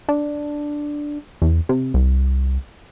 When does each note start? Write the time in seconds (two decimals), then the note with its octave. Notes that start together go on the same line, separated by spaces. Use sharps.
0.09 D4
1.42 E2
1.69 C3
1.94 C2